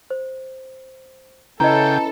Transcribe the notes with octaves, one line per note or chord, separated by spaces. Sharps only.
C5
C#3 C#4 E4 A4 B4 D#5 G5 A#5